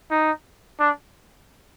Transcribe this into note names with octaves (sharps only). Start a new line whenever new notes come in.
D#4
D4